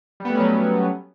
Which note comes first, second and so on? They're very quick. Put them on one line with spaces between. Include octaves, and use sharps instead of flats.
G3 B3 A3 C#4 F#3